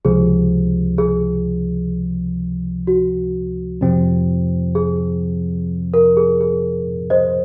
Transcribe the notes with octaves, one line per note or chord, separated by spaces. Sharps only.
C#2 C3 F3 G#4
G#4
F#4
F2 C3 F3 C4
G#4
A#4
G#4
G#4
C5 D#5